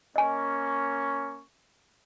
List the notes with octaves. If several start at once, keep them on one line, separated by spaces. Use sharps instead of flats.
A#3 C#4 D#5 G#5 C#6